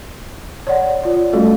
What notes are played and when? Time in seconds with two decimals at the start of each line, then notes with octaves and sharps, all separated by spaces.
0.67 C#5 D5 F#5
1.04 F4 D5
1.33 G3 A3 C#4 F#4 A4